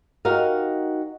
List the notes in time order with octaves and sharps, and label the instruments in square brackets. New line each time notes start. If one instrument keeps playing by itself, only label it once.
[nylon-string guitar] D#4 F#4 G4 A#4 D#5 F5